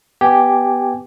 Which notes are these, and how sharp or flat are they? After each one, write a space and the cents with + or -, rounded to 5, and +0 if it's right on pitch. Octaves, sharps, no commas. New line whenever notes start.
B3 +0 G4 +0 G#5 +0